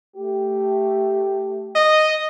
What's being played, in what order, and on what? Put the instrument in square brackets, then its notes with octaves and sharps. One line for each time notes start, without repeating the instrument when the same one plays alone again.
[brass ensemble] A3 G4
[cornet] D#5